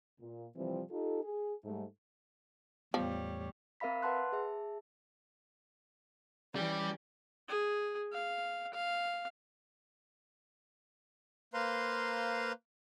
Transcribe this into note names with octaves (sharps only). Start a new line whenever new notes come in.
A#2
C3 E3 F3 G3 C4
D#4 F4 G4 A4
G#4
G#2 G3 A3
E2 A2 F3 G3 B3 C#5
C4 A#4 E5 F5 B5 B6
B4 F#5 A5 C6 F#6
G#4 E5 A5
E3 G3 C#4 G4 D5
G#4
F5
F5
A#3 B4 C5 F5 A#5 C6